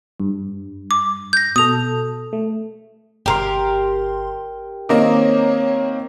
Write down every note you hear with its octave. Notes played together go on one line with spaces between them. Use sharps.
G2
D6
G6 A#6
B2 A4 D#6 F7
A3
G1 G4 A#4 C6
D#3 A#3 C4 C#5 D#5 A#5 D6